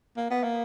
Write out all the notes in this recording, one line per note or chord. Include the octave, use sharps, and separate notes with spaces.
A#3
B3
A#3